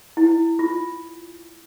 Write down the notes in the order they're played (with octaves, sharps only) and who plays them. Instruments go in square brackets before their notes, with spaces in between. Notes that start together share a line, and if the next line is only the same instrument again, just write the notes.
[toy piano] E4
F4